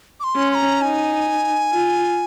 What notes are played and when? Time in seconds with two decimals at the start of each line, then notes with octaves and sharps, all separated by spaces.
0.20 D6
0.24 C6
0.36 C#4
0.51 C6
0.55 A#5
0.81 D#4 G#5
1.72 F4